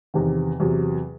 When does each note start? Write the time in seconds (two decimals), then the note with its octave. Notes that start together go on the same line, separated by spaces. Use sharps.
0.14 E2 C3 D#3
0.60 E2 C3 F#3